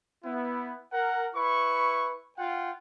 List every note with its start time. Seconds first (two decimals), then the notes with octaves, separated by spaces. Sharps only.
0.24 B3 E4
0.93 A#4 F#5
1.35 E4 B4 C#6
2.38 F4 F#5 G5